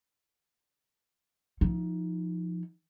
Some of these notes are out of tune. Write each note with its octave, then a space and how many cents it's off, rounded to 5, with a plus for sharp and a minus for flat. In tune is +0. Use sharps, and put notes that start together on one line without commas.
F3 +0 D#4 +15